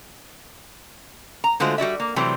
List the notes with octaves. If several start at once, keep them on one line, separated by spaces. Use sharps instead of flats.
A#5
D3 G#3 A3 F4 F#4 C5
G3 F#4 D5 E5
A#3
C3 E3 F#3 G3 A3 C4